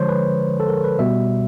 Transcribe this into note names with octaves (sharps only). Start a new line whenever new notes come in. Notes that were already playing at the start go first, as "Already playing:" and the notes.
Already playing: D3 F3 G#3 C5 C#5
B4
A4
A#4
B4
B2 G3 E5